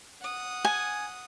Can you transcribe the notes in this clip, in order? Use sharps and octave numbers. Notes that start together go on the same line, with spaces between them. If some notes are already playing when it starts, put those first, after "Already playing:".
F#5 D#6
G#5